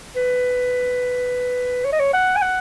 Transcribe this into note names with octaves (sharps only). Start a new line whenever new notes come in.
B4
C#5
D#5
C#5
F#5
G#5
F#5